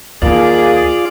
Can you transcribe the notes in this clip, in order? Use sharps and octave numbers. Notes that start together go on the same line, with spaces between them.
D#2 A#3 F4 G#4 D5